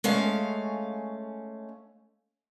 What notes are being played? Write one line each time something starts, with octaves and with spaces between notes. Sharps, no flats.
G#3 A3 C#4 F5